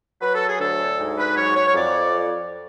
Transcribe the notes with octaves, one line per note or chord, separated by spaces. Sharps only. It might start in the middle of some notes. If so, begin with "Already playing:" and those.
F#3 B4
A4
G#4
D2 A4
G#2
B4
F#3 C#5
C#5
C#5
F2 D5